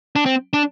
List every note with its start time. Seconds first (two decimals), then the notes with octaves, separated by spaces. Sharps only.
0.16 D4
0.26 C4
0.53 D4